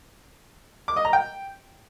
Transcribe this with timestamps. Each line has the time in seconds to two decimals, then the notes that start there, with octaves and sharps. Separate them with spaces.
0.88 D6
0.96 D#5
1.05 A#5
1.13 G5